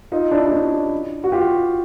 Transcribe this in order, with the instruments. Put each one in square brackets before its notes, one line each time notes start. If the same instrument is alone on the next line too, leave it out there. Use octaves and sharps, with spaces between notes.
[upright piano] D#4 F4
D4 E4
D4
C#4 D#4
F#4
F4 G4